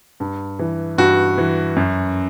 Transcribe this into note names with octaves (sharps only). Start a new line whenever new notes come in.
G2
E3
G2 F#4
E3
F#2